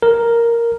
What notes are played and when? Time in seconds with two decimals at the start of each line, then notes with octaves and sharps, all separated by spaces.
0.02 A#4